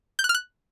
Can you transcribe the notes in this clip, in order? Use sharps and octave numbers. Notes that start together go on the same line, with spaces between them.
G6
F#6
F6
F#6